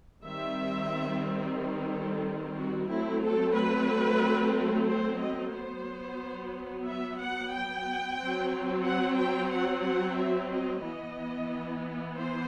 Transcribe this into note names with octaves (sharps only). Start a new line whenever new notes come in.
D#3 G3 C4 E5
A4
F#4
F#3 A3 C4 E4
A4
B4
C5
D#5
F#3 B3 C5
E5
F#5
G5
F#3 C4
F#5
G5
F#5
F#5
E5
D#5
E3 B3 D#5
C5